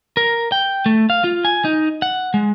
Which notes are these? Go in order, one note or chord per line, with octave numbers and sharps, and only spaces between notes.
A#4
G5
A3
F5
F4
G#5
D#4
F#5
G#3